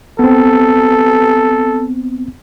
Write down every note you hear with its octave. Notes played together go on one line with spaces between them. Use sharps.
B3 C4 A4